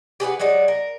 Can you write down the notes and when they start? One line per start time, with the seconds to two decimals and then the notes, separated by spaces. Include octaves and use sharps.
0.20 G4 G#4 B4 F#5
0.39 F#3 G#3 D#4 D5
0.68 A#4